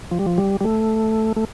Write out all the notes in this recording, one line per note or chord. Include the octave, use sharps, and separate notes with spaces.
F3
G3
F3
G3
G3
A3
A3